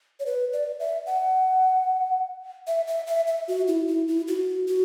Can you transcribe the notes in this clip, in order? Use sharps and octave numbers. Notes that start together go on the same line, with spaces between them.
C#5
B4
D5
E5
F#5
E5
E5
E5
E5
F#4
E4
E4
E4
F#4
F#4